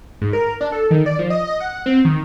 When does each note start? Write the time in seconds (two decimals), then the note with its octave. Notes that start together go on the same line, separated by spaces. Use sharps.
0.22 G#2
0.33 A#4
0.61 D4
0.72 A4
0.91 D#3
1.06 D5
1.19 F3
1.30 D#5
1.47 D#5
1.60 F#5
1.86 C4
2.05 D#3